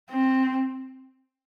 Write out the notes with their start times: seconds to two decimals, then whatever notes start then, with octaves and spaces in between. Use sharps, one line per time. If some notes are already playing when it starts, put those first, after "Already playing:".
0.10 C4